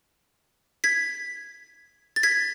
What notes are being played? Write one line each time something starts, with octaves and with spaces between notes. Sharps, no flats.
G#6 B6
A6
G#6 B6